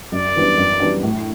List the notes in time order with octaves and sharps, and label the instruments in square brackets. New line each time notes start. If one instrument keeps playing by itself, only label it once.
[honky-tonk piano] F#2 [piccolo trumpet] D5
[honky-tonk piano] E3 G3 B3 D4
F#2
E3 G3 B3 D4
A2